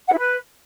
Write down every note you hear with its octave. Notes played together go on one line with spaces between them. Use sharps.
F#5
E4
B4